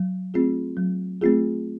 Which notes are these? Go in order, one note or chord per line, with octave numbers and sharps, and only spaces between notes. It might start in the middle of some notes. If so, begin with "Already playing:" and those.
Already playing: F#3
A3 C4 F4 G#4
F#3
A3 C4 F4 G#4